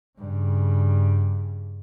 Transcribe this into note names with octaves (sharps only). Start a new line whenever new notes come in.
G2 C#3